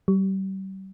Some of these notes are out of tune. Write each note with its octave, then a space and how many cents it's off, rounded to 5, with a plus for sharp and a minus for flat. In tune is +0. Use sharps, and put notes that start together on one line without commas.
G3 -35